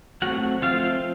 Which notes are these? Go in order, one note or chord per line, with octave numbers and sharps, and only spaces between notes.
F#3 A3 C4 F#4 F#5
F3 A3 C4 F4 F5